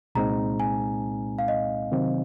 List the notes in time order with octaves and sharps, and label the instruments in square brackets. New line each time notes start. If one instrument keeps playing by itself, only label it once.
[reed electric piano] C2 A#2 G#3 C4 D#4 [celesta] A#5
[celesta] G#5
F5
D#5
[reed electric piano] C3 D#3 F#3 C4